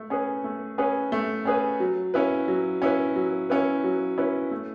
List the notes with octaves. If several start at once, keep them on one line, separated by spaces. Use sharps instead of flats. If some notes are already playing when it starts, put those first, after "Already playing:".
Already playing: A3
C#4 G#4 B4
A3
C#4 G#4 B4
A3
C#4 G#4 B4
F#3
C#4 E4 B4
F#3
C#4 E4 B4
F#3
C#4 E4 B4
F#3
C#4 E4 B4
A3